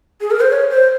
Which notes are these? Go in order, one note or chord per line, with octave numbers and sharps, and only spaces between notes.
G#4
A#4
C5
C#5
C5